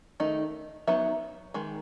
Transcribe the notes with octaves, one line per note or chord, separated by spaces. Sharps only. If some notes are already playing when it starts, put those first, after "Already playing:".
D#3 A3 D#4
F#3 B3 D#4 E5
D#3 G#3